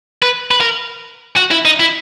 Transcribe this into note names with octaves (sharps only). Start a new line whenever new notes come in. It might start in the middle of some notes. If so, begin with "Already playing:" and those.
B4
B4
A#4
F#4
E4
D#4
E4